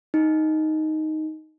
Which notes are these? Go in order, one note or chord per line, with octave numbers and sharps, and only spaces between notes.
D#4